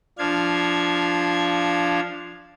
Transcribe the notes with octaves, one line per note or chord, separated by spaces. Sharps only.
F3 D4 F5 G#6